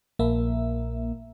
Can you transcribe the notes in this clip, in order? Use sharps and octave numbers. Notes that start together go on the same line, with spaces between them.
A#1 A#3 E5